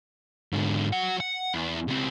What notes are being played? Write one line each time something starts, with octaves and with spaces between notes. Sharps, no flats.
G#2 D3
F#3 F#5
F#5
E2
C#2 C4